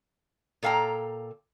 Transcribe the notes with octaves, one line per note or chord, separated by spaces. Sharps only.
A#2 A4 F5 G5 A#5